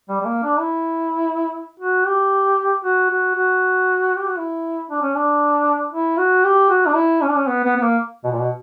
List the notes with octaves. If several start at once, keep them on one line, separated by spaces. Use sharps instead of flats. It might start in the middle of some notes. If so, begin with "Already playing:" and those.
G3
G3
A#3
D4
E4
F#4
G4
F#4
F#4
F#4
G4
F#4
E4
D4
C#4
D4
E4
F#4
G4
F#4
D4
E4
C#4
D4
C#4
B3
B3
B3
A#3
B2
A#2
B2